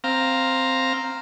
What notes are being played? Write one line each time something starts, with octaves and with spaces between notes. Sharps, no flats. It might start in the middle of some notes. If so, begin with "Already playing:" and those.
C4 F5 A#5